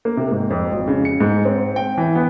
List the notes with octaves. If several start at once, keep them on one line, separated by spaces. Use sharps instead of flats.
A#3
C3
G#2
F2
G#1
C#3
C#7
G#2
C4
G5
E3
B3